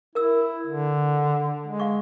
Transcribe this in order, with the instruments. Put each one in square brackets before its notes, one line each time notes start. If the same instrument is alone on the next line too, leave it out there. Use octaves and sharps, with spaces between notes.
[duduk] E4 [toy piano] A#4 E6
[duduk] D3
G#3
[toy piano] F5 C#6